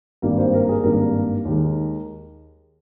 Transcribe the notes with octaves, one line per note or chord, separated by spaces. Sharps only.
G#1 G2 G3 A#3 A#4
C5
A#4
G#4
G#1 G2 G3 A#3 A#4
D#2 D#3 G#3